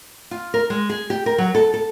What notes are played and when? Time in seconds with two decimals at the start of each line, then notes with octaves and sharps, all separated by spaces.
0.31 F4
0.54 A#4
0.70 G#3
0.90 G#4
1.10 G4
1.26 A#4
1.38 F#3
1.55 A4
1.74 A4